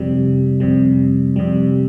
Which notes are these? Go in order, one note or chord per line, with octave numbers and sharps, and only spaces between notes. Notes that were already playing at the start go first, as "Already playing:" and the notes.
Already playing: F2 C3 G3
F2 C3 G3
F2 C3 G3